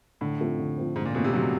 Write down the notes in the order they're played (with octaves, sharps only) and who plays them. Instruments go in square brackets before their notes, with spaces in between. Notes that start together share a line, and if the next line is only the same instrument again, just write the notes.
[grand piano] A2 [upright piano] D3
[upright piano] F3 A3 C4
D3
F3 A3 C4
[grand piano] G#2 [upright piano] D3
[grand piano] A#2
[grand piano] B2 [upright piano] F3 A3 C4
[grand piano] C3
[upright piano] D3 [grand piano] F#3